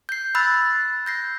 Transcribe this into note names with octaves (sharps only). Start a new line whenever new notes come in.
G6 C7
B5 E6 F#6 A6
G6 A#6 C7